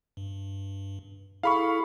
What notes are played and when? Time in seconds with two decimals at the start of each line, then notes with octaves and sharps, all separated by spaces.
0.17 G2
1.43 E4 G#4 A4 F5 B5 C#6